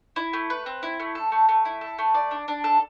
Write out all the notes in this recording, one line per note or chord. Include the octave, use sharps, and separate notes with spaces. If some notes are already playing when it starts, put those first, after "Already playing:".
E4
A3
B4
C4
E4
A3
A4
A3
A3
E4
A4
A3
D5
D4
D4
A4